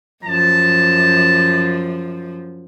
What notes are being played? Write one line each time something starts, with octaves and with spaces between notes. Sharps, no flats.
F#2 F3 A5